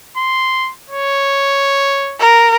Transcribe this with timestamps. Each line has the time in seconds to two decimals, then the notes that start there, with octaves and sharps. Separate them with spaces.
0.17 C6
0.90 C#5
2.20 A#4